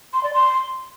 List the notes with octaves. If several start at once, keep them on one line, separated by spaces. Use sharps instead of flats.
C6
D5
C6